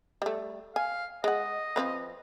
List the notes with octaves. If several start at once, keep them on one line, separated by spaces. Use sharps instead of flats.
G3 A3
F5 G#5
G#3 D#5 F#5
F3 C4 B4